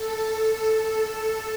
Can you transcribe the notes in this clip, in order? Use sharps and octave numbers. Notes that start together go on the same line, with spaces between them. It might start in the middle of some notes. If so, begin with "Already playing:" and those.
Already playing: A4